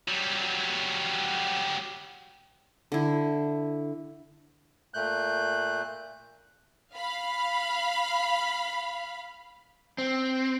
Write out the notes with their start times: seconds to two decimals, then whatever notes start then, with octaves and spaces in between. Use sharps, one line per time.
0.08 F#3 G3
2.92 D3 E4
4.94 A#2 A3 F#6 G6
6.95 F5 B5
9.98 C4